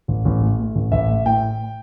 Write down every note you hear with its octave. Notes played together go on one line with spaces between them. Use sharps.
A1
A1
A3
A3
A1
A1 E5
A2
A2 G5